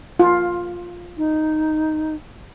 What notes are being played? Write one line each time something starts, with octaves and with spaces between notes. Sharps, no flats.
F4
D#4